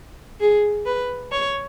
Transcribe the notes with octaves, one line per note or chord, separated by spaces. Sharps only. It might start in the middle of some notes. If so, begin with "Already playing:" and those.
G#4
B4
C#5